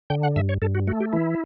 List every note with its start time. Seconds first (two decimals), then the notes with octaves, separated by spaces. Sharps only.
0.10 D3 G5
0.23 F#5
0.36 G2 E5
0.49 C#5
0.62 G2 A4
0.75 F#4
0.87 A3 F#4
1.00 G4
1.13 E3 E4